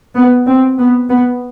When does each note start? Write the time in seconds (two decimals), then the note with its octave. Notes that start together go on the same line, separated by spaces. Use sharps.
0.16 B3
0.47 C4
0.77 B3
1.09 B3